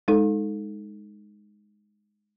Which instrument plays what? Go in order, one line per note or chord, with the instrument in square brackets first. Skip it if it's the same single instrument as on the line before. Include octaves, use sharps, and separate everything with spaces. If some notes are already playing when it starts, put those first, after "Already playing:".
[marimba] G#3 D#4 A4